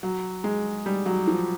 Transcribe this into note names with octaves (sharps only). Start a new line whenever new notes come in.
F#3
G#3
G3
F#3
F3